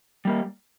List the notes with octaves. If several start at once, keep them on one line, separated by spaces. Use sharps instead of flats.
G3 A#3